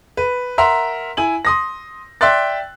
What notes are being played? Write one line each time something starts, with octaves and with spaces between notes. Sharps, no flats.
B4
A#4 E5 F#5 A#5 C6
E4 G#5 F#7
C6 D#6 A#6
D5 E5 G5 C6 F#6 A6